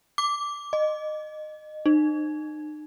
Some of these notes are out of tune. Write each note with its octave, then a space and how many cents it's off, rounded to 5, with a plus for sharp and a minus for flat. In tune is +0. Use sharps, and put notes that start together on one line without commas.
D6 -10
D#5 -20
D#4 -40